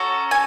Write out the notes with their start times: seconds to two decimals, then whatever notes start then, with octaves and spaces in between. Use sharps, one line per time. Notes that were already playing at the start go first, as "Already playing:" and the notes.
Already playing: C#4 F#4 A4 A#5
0.31 G#5